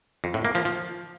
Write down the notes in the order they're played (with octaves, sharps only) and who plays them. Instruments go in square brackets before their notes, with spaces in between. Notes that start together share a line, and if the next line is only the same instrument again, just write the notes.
[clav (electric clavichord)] F2
A2
A#3
F3
F3